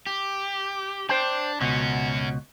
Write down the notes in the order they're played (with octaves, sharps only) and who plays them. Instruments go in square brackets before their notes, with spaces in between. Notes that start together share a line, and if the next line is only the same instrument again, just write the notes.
[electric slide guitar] G4
[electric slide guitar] D4 [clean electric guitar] C5 G5
[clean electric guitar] C#2 B2 [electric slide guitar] C#4 F#4